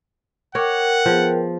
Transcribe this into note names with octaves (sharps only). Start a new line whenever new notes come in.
A#4 C#5 F#5 G5 D6 F6
F3 B3 G#4 B4